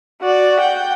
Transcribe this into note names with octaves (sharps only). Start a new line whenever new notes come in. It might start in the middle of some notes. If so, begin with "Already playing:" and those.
F#4 D5
F#5 G5